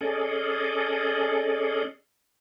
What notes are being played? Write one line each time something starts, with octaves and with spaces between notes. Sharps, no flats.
C#4 G#4 A4 D5 D#5